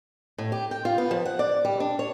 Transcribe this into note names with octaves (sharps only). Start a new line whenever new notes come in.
A2
G4
G5
F4
B3
F3
F#5
D5
G3
D4
C#5